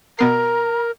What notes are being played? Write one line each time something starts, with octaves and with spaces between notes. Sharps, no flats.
B2 B3 A#4 A#5 C7